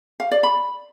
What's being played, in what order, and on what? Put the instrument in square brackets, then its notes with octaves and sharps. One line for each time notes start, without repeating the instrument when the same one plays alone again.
[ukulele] F5
D5
B5